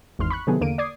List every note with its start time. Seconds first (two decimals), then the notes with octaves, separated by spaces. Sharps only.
0.19 G#1 E2 G#2 C6 F6
0.30 B5 C#6 F#6
0.47 C3 D#3 F#3 A3 B3 G#4
0.61 E2 D3 A#3 D7 D#7
0.78 D5 D6 D#6 G#6 C7